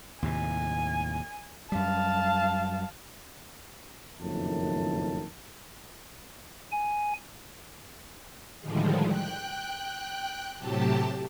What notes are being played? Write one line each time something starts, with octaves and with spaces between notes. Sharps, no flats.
D#2 A2 C3 G#5
F#2 G3 F5 A5
F#1 F2 A2 D#3 A5
G#5
A2 D3 D#3 F3 G3 G#3
G5 F#6
A2 C3 F#3 G4 A5